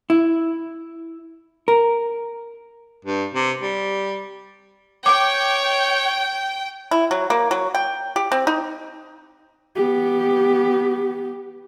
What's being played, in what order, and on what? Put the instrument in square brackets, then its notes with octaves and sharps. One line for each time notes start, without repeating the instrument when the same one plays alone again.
[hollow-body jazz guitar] E4
A#4
[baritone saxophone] G2
C3
G3
[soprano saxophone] C#5 [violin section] G5 [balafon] D6
[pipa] E4
F#3
A#3
F#3
G5
G4
C4
D#4
[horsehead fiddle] B3 G4